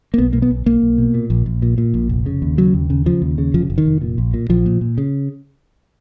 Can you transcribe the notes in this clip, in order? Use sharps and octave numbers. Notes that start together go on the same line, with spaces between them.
A#3
B1 B3
B2 A#3
B3
B1
B1 A#3
B1
B2
A#2
A#1
A#1
A#2
A#2
A#1
F1
C#3
D#2
C#3 F#3
D#2
C#3
C#3 F3
D#2
C#3
F1 F3
F1
D#3
F1
A#2
A#1
A#2
A#1 F3
A#2
A#2
C#3